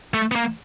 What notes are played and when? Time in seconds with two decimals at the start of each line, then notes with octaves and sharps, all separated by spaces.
0.14 A3
0.31 B3
0.36 A#3